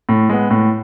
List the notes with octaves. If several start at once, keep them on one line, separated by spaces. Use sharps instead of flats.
A2
G#3 B3
A2